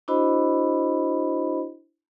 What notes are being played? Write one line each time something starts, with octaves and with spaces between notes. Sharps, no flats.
D4 E4 F#4 C5 D#5 B5